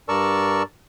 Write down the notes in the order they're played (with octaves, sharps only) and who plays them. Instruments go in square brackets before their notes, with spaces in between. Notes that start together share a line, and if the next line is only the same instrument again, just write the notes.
[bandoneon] G2 A#4 D5 A5 C#6 E6